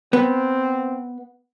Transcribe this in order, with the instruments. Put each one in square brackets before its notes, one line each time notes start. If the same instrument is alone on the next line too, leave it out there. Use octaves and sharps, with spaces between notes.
[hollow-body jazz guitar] B3 [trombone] C4